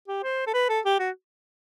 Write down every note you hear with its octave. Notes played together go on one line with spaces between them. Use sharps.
G4
C5
A4
B4
A4
G4
F#4